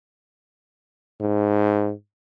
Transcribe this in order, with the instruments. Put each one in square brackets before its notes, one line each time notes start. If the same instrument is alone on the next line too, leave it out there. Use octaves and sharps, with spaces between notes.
[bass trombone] G#2